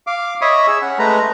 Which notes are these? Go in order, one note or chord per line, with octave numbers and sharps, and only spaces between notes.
F5 D6
C#5 D#5 E5 B5 C#6 D#6
G#4 E6
C#4 F#5
G#3 A3 B4 A#5